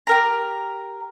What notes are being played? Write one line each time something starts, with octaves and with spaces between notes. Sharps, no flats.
G4 A#4 A#5